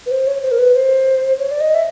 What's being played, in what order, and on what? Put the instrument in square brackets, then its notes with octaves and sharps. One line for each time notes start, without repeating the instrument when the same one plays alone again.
[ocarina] B4
C5
C#5
C5
A#4
B4
C5
C#5
D5
D#5
E5